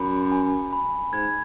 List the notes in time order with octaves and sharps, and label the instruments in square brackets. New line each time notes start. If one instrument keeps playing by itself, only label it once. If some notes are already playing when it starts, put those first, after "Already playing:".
Already playing: [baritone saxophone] F#2 [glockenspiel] B5
[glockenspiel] G#5
B5
[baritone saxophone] G#2 [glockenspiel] G#6